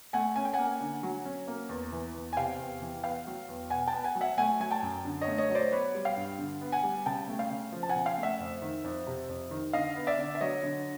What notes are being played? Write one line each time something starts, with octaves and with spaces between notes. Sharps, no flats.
A3 F#5 G#5
C#4 G#5
G5
A#3 F#5 G#5
D3
F#3
C#4
A#3
E2
E3
E2
G#5
C3 F5 G5
E2
E3
B3 F5 G5
F#3
E2
B2 F#5 G#5
G5 A5
B3
F#5 G#5
F#3
E5 F#5
A3 F#5 G#5
F#3 G#5
G5 A5
F#2
D3
C#5 D#5
A3
C#5 D#5
F#3
C5 D5
B3 B4 C#5
G3
F5 G5
G2
D3
B3
F#5 G#5
G3
C#3 G5 A5
A3
F5 G5
C#3
F3
A5
F#5 G#5
C#3
F5 G5
A3
E5 F#5
F2
D#3
F2
C3
F2
D#3
D3 D#5 F5
B3
D5 E5
D3
E5
F#3 C#5 D#5
D3